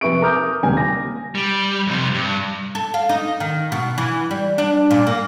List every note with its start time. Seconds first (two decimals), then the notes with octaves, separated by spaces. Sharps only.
0.01 F2 C3 B4 E5 C#6 D7
0.22 A#4 A#5 D6 D#6 F6 G6
0.63 D#1 C#2 C3 G#5
0.77 A#6
1.35 G3
1.87 F2 C3
2.14 G2
2.75 A4
2.94 F5
3.09 D#4
3.40 D#3
3.72 B2
3.98 E3
4.31 G3
4.58 D4
4.91 A#2
5.07 A#3